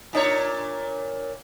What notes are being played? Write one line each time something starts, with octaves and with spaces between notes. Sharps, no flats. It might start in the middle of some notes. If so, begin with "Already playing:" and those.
A#2 D4 C#5